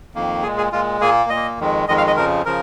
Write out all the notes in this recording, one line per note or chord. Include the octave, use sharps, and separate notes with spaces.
F2 D#3 A#3
A#2 G#3 G#4
G#4
A#2 G#3 F4
A#2 A#3 G#4
A#2 D#5
A#3
F2 D#3 G#3
F2 D#3 G#3 D#5
F5
D#5
F2 C#3 F3 A#4
C#3 F3 A#4